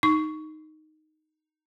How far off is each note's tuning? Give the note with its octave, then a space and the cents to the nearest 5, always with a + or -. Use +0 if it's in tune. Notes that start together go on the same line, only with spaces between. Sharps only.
D#4 +0 C#6 +15